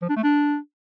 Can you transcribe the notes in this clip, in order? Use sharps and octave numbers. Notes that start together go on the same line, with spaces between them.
F3
D4
A3
D4